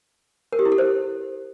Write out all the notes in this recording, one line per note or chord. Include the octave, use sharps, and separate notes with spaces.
A#4
G4
E4
A4
C5